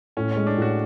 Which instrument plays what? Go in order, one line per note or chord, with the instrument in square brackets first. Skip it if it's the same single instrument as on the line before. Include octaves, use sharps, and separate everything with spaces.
[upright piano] A2 [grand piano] C#4
[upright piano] G#3 [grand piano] C#4
[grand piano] D4
[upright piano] A2
[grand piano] F#4